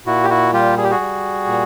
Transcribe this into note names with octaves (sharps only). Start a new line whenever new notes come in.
A#2 E4 F#4
G4
E4 F#4
G3 F4 G4
G#4
G4
F#4 G#4
G3
A#2